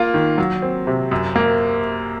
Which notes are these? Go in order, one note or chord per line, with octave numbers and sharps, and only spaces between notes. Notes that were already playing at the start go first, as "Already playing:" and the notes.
Already playing: A#3 F4
D#3
F#3
C4
C3
F#2
A#3